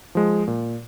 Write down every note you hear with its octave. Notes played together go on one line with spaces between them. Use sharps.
F3 G#3
A#2